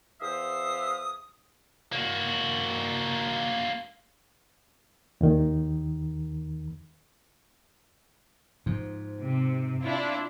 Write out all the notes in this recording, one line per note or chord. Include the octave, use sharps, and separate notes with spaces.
E2 C5 E5 F5 D#6
A#3 F#4
D#2 D#3
G#2 F3
C3
D4 E4 F4